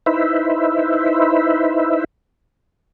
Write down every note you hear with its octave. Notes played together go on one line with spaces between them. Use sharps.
D#4 E4 B4 C5 E5